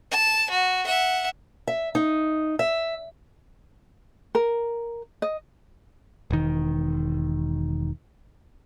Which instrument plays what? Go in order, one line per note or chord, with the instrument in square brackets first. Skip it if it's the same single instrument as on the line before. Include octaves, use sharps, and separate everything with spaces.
[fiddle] A5
F#4
E5 F#5
[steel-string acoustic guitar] E5
D#4
E5
[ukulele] A#4
D#5
[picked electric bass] E1 D#3